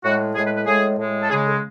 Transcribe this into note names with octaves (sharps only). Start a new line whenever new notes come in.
A2 G#3 F#4
A2 G#3 G#4
B4
B4
A2 G#3 G#4
A2 G#3
A4
C#3 G#3 G#4
A4